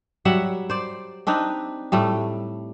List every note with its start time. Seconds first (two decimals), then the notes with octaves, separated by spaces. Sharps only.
0.25 F#3 G3 E5 F#5
0.70 C5 D5
1.27 C4 D4 D#4 B4
1.92 A2 G3 A3